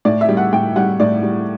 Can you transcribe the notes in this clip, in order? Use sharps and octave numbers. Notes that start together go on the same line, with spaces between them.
A2 D5
E5
G3
F#5
A2 G5
G3 F#5
A2 D5
G3